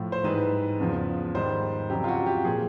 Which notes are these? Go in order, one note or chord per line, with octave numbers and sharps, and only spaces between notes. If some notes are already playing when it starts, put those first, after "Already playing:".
Already playing: A2 F3
C5
G#2 E3 G3 B4
E2 C#3 F3
G#2 D#3 G3 C5
F2 C#3 F#3 G4
F4
F#4
G4
A#2 F3 G#4